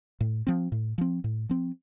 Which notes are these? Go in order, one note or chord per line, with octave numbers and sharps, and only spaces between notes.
A2
F3 C4
A2
F3 C4
A2
F3 C4